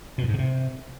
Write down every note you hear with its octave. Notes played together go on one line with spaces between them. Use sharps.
B2
F2
G#2
D3
C3